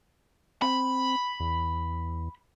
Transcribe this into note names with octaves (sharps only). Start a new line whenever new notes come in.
C4 B5
E2